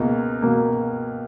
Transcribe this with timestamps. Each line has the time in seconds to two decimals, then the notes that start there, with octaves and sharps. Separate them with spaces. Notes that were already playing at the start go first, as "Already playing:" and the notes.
Already playing: C#2 B2 A#3
0.42 B2 A#3